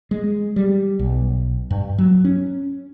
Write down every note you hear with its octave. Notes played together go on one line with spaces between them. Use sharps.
G#3
G3
B1
G2
F#3
C#4